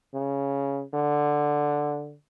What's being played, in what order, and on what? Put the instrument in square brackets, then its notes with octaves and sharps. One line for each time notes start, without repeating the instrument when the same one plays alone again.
[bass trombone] C#3
D3